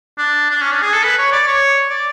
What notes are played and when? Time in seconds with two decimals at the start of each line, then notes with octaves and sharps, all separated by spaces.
0.18 D4
0.51 D4
0.61 C#4
0.71 D4
0.82 G#4
0.93 A4
1.04 B4
1.19 C#5
1.32 D5
1.47 C#5
1.90 D5